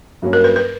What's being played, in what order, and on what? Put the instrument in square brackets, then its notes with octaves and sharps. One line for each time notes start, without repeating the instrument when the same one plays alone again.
[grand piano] G2 F#3 A#3 C#4
[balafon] A#4
B4
B4